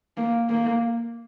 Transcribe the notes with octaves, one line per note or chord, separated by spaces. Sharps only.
A#3
A#3